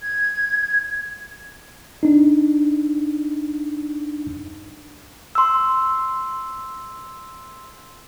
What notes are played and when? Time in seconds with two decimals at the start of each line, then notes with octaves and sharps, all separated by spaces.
0.02 G#6
2.03 D4 D#4
5.35 C6 E6